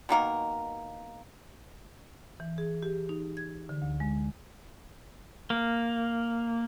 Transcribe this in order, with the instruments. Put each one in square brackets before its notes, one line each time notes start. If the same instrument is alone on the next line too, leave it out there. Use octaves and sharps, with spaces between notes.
[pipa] B2 D#3 A#3 A#4
[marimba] E3
G#4
G4
D#4
G#6
D3
D2
G#3
[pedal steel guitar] A#3